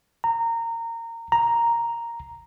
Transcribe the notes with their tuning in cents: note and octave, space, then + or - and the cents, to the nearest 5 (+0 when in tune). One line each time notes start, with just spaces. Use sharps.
A#5 -20
A#5 +0